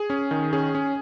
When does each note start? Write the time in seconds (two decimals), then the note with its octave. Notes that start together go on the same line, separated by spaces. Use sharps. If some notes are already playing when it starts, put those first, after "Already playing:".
Already playing: G#4
0.10 C#4
0.31 D#3
0.53 C#4 G#4
0.75 C#4